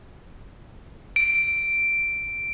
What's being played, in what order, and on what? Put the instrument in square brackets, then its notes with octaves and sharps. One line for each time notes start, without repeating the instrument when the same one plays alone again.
[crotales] D7